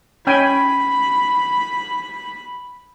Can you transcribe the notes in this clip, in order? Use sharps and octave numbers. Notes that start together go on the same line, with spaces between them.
C#4 G5 G#5 B5